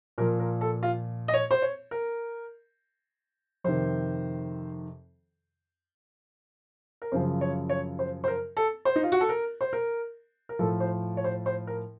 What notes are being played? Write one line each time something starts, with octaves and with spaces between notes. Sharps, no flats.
A#2 F3 A#4
A#4
A4
F4
D#5
C#5
C5
C#5
A#4
F2 C3 D#3 C5
A#4
F#2 C#3 F3 C5
C#5
C#5
C5
C5
A#4
A4
C5
D#4
F4
F#4
A4
A#4
C5
A#4
A#4
A2 F3 A4
C5
C#5
C5
C5
A#4